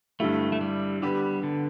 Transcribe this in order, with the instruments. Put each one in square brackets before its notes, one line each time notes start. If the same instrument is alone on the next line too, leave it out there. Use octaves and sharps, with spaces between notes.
[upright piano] G2 D3 G3 E4 [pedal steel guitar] A3
[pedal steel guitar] A3
G3
[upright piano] D3 B3 G4 B4 [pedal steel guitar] G3
[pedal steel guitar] D3